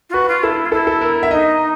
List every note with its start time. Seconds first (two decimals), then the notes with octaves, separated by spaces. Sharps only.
0.10 F4
0.13 F#4 B4
0.29 F4
0.43 E4 A4
0.65 F4
0.72 E4 A4
0.87 A4
1.01 A#4
1.23 E5
1.31 D#4 D#5